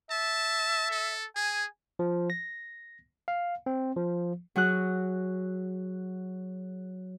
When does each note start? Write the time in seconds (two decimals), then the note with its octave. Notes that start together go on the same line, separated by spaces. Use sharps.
0.11 E5 A5
0.90 A4
1.36 G#4 G#5
1.99 F3
2.30 A#6
3.28 F5
3.66 C4
3.96 F3
4.56 F#3 F#4 G#4 F#6